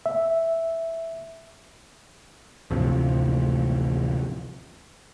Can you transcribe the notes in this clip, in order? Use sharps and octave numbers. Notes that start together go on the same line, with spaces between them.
E5
A1 D2 C3 F3